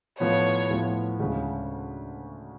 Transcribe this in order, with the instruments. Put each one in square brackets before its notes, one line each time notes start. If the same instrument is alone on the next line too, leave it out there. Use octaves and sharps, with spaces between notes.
[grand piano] A2 F3 B3 [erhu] C#5
[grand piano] A2 F3 B3
D2 C#3 G#3